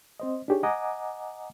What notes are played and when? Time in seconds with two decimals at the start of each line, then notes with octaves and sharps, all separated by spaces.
0.20 C4 C5 D#5
0.48 D4 D#4 G4 G#4 C#5
0.63 D#5 F#5 G#5 A#5 D6 D#6